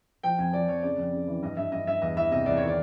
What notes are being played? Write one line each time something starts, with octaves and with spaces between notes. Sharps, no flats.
F3 G5
F2 G#5
F3 D5
F2 C#5
C#3 D5
F2
C#3
E3
G2 D#5
G2 E5
G2 D#5
G2 E5
E2 D#5
E3 E5
C3 D#5
E2 D5
D#3 C#5
D5